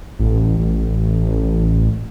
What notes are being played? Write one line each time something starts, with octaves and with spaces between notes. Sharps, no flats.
A1
A1